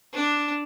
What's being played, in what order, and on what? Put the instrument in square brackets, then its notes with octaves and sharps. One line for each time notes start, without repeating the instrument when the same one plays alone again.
[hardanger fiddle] D4